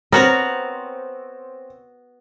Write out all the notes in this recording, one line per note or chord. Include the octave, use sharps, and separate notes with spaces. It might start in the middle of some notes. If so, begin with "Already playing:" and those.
B3 C4 F#4 A#4 C#5 A#5